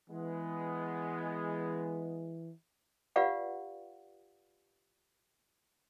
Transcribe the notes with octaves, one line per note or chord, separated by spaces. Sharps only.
E3 G#3 B3
F4 G4 B4 D5 F5 F#5